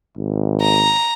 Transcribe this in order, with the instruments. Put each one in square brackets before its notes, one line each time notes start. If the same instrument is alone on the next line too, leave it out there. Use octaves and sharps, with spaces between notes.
[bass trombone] G#1
[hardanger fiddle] A#5